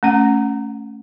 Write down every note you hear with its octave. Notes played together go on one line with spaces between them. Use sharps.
A3 C#4 F#5